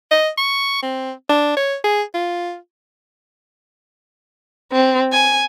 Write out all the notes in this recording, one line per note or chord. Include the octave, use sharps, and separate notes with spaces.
D#5
C#6
C4
D4
C#5
G#4
F4
C4
G#5